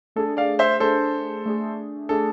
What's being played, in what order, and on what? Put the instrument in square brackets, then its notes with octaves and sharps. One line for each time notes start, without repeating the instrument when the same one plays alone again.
[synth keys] A3 D4 G#4 [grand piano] A4
[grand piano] D5 F5
C5 E5
[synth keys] A3 D4 G#4 [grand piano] A4 C5
[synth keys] A3 D4 G#4
[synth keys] A3 D4 G#4 [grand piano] A4